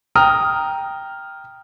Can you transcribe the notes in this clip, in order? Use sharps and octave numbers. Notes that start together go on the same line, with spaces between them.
G5 A#5 D#6 F6